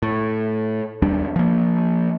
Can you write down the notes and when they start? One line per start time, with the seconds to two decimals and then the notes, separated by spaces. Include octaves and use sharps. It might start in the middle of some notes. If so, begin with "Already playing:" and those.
0.03 A2
1.02 D#2 G3 D4
1.36 F3 A#3